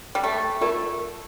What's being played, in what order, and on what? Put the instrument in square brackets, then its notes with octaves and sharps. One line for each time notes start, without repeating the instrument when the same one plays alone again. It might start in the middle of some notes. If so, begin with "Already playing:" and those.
[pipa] G3
A3
[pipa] A3 [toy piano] F4 A#4 D5